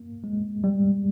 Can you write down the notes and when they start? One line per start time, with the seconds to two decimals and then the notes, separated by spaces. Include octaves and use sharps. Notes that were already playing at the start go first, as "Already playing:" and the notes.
Already playing: A#3
0.24 G#3
0.64 G3